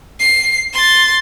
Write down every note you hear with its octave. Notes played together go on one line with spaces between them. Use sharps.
C7
C6 A6